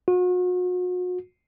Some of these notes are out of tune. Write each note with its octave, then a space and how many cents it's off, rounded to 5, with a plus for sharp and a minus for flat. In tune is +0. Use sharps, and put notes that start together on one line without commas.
F#4 -40